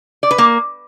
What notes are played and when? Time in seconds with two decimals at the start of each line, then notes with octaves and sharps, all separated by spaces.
0.23 D5
0.31 B4
0.38 A#3